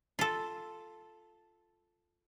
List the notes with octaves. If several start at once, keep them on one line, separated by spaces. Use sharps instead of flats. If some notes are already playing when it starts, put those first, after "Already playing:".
F4 A4